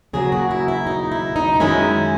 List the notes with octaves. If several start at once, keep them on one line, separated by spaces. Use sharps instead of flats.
C#3 F#3 A#3 G#4
F#4
E4
E4
D#4
E4
D#4
F#2 D#3 G#3 C#4 E4